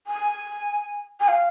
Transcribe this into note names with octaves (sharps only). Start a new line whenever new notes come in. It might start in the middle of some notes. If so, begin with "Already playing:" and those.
G#5
G#5
F5